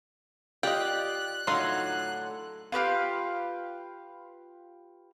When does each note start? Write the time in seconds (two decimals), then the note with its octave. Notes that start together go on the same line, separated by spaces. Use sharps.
0.63 F4 G4 D5 D#5 G5 F#6
1.47 A2 D3 F#3 D#4 F4 C6
2.72 F4 G4 B4 F5